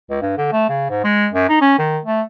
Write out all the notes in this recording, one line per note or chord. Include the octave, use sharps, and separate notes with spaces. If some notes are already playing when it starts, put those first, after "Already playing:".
C#2
G2
D3
A3
C#3
G#2
G#3
F#2
D#4
C#4
D#3
A3